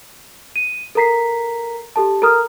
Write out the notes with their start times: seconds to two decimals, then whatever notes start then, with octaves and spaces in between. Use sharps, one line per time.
0.56 D#7
0.95 A4 A#4 A#5 B6 C7
1.96 G4 A4 A5
2.22 A4 A#4 A#5 D#6 F6